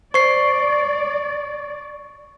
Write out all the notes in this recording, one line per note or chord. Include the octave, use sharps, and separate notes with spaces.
C5 D5 C#6 C7